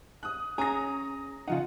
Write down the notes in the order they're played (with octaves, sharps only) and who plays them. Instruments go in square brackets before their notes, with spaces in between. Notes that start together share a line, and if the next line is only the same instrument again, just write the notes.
[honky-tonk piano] D#6 F#6
[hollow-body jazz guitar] C#4 G#4 [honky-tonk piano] A#5 D#6 A#6
[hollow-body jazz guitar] C#3 F3 D#4 [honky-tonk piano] F4 F#5